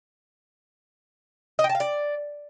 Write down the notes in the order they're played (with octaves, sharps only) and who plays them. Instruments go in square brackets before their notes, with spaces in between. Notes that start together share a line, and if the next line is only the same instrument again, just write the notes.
[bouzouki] D#5
G5
A5
F5
D5